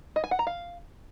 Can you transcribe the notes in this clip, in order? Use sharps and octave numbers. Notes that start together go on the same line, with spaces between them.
D#5
G#5
F#5
A#5
F5